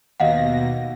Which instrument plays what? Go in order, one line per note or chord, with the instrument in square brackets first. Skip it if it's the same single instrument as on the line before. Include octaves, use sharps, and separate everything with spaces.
[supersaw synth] D#2 B2 A#6 [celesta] D#5 F5 F#5